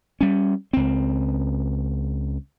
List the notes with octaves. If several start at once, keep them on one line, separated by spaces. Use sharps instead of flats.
G3 C#4
C#2 C4